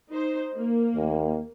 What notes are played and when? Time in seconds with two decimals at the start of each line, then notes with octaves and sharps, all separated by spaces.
0.11 D#4 C5
0.56 A#3
0.96 D#2